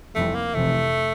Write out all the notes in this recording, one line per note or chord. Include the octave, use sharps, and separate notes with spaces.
F1 F2 E3 G3 A3 C4
A#3
F1 F2 C3 E3 A3